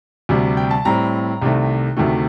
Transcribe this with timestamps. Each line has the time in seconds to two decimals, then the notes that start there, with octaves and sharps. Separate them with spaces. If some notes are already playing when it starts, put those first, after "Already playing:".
0.29 D2 C3 G3
0.57 G5
0.71 A5
0.85 A2 G3 C4 A#5
1.42 C2 C3 D#3 A3
1.97 D2 C3 D#3 A3